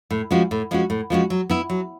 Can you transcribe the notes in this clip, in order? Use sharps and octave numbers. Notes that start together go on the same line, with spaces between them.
A2
F3 G#3 C#4 F#4
A2
F3 G#3 C#4 F#4
A2
F3 G#3 C#4 F#4
F#3
B3 E4
F#3